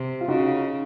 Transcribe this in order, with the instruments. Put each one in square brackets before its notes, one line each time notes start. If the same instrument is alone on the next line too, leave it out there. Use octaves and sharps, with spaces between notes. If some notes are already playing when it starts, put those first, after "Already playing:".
Already playing: [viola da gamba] C3
[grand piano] F4
[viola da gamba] C#3 [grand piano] D#4 F#4